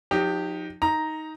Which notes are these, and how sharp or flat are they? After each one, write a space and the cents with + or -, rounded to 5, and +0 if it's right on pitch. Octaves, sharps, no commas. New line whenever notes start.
F3 +45 D#4 +0 G4 +0
D#4 +10 A#5 +0